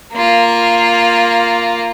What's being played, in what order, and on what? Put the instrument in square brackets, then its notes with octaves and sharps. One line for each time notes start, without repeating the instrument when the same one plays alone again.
[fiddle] A#3 F4